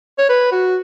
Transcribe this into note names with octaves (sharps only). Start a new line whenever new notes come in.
C#5
B4
F#4